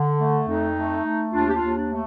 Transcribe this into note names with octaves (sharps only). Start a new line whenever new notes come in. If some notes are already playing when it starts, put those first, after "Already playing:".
Already playing: D3
A3
F2 D#4
A3
A3
D#2 D4 F4
G4
D4 F4
D#2
D4
A3